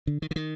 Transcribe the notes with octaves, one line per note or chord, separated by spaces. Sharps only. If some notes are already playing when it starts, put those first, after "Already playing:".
D3
D#3
D3
D#3